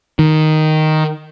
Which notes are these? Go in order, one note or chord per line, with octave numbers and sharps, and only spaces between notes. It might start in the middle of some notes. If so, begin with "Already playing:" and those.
D#3